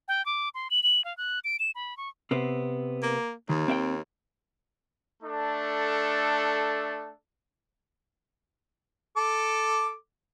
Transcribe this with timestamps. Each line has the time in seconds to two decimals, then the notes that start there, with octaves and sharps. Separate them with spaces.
0.08 G5
0.26 D6
0.55 C6
0.71 F#7
0.83 F#7
1.05 F5
1.17 F#6
1.44 D7
1.59 E7
1.75 B5
1.97 C#6
2.31 C3 B3 C4
3.02 A#3
3.49 D#2 D#3
3.68 C4 E5 G5
5.23 A3 D4 A4
9.17 A4 D6